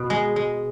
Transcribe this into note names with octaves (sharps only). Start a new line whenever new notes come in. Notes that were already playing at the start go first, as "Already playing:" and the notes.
Already playing: B2
G#3
G#3